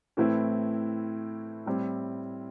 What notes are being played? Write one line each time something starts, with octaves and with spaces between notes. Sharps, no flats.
A2 E3 A3 C4 E4
A2 G3 C4 E4